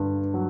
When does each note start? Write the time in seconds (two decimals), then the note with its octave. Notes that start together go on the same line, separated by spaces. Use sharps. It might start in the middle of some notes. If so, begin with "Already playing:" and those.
Already playing: G2 D3
0.34 F#3